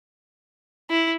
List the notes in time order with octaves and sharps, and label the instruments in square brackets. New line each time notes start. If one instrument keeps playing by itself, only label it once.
[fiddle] E4